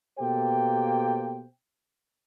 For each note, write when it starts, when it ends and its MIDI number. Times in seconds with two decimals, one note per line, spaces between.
0.18 1.43 47
0.18 1.43 58
0.18 1.43 67
0.18 1.43 69
0.18 1.43 72
0.18 1.43 79